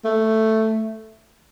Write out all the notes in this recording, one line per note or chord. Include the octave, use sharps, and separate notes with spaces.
A3